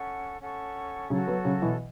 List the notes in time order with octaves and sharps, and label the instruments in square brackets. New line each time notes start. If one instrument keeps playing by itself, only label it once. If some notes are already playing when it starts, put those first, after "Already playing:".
Already playing: [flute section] C#4 A4 F#5 C#6
C#4 A4 F#5 C#6
[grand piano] C#3 F#3 [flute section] F#4 A4 C#5
[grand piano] F#3 B3
C#3 F#3
B2 E3